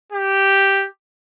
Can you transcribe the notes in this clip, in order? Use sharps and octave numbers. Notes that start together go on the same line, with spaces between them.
G4